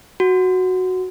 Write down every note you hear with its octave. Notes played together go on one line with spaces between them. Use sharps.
F#4